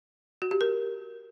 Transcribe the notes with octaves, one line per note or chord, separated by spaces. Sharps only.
F#4
G4
A#4